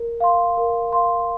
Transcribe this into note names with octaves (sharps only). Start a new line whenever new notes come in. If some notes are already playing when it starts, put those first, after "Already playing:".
Already playing: A#4
F5 C6
A#4
F5 C6